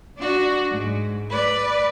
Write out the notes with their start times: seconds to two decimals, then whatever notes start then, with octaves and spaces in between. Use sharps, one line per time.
0.18 D4 F#4
0.69 G#2
1.30 B4 D5